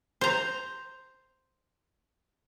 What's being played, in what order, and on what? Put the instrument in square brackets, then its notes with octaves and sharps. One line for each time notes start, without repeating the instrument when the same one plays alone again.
[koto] C5 A#5